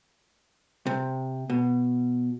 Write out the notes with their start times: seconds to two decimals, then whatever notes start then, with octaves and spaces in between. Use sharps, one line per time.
0.87 C3
1.50 B2